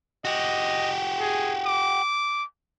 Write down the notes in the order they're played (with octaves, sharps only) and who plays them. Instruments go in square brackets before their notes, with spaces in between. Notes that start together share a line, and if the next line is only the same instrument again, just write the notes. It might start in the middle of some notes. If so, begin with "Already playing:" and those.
[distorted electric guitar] F#4 G4 [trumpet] D#5
[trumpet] G#4
D6